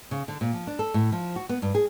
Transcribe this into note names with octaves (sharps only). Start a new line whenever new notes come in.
C#3
D3
A#2
F3
D4
A4
A2
F3
F#4
B3
G2
G#4